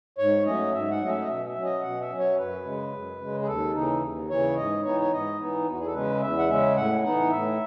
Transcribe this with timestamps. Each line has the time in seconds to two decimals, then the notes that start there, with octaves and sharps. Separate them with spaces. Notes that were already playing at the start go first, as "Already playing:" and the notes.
0.18 G#2 C#5
0.46 F#3 A3 C#4 D#5
0.73 G#2 E5
0.91 F#5
1.01 F#3 A3 C#4 D#5
1.10 E5
1.22 D#5
1.28 B2 E5
1.46 E5
1.56 F#3 C#4
1.64 D#5
1.82 B2 F#5
2.00 E5
2.10 F#3 C#4
2.19 C#5
2.37 F#2 B4
2.64 C#3 G#3
2.93 F#2
3.20 C#3 G#3
3.42 G#4
3.47 D#2 A4
3.74 C#3 E3 D#4
4.02 D#2
4.30 C#3 E3 C#5
4.56 G#2 D#5
4.84 E3 B3 D#4 C#5
5.00 C#5
5.12 G#2 D#5
5.39 E3 B3 D#4
5.67 E2 F#4
5.79 G#4
5.86 A4
5.94 C#3 G#3 C#4 B4
6.21 E2 E5
6.39 F#5
6.48 C#3 G#3 C#4 E5
6.76 A2 F#5
7.03 E3 B3 D#4 F#5
7.31 A2 E5